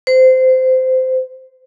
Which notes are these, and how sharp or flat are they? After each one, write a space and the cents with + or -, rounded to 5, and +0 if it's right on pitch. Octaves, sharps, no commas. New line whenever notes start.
C5 -15